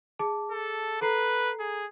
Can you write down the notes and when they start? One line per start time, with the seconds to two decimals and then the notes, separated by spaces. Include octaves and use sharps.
0.19 G#4 A5 D6
0.51 A4
1.01 A4 B4 A#5 C7
1.59 G#4